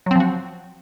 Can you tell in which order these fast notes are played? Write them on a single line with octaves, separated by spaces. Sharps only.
F#3 C4 F3 F#4